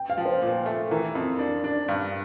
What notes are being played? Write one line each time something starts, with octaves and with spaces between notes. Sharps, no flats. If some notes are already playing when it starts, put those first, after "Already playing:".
Already playing: G5
F5
F3
C5
A#2
A3
E3 A#4
F2
D4
D4
G2